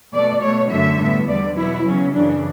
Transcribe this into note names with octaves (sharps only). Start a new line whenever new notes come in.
B2 A3 D5
B2 A3 C#5
F#2 D3 F#3 A3 E5
A2 G3 B3
E2 D3 G3 D5
B2 F#3 B3 E4
E2 C#3 F#3 C#4
F#2 C#3 E3 D4